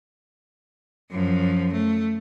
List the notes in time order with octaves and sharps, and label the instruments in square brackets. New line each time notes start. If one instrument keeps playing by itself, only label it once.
[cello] F#2 F3
A3